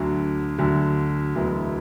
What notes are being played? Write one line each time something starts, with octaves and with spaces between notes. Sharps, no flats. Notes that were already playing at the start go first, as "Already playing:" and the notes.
Already playing: D2 D3 F#3
D2 D3 F#3
E1 D2 D3 F#3 B3 E4